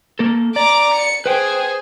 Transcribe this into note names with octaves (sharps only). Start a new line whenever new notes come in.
A#3 A4
D5 A#5 D6
C#7
G#4 B4 C5 G5